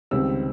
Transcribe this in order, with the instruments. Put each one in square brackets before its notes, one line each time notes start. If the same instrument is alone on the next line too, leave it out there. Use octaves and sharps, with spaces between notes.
[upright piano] C#2 C3 D#3 G3 C4 E6